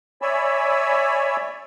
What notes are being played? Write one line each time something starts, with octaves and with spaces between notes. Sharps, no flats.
C#5 D5 E5 G#5 B5 E6